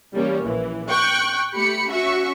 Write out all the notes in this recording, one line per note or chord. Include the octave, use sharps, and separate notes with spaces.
E3 G3 A#3 C#4
A#1 E3
G5 C#6 F#6
A3 G4 B5 C#7
C#4 F#4 E5 C#6